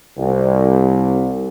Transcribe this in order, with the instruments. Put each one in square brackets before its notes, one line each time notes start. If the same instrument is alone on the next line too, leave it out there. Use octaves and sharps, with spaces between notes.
[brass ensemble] C2